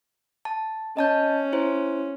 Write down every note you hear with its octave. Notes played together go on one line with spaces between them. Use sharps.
A5
C#4 D#5 A5 G6
E4 C5